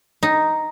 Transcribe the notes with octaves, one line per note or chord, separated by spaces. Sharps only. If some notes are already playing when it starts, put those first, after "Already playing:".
D#4